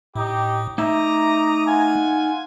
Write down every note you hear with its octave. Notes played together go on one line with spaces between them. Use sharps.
A2 D#4 G4
A3 D#4 E5 A#5 D6 D#6
F4 F#5 G#5